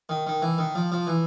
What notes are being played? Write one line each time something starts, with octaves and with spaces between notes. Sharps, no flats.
D#3
D#3
E3
D#3
F3
F3
E3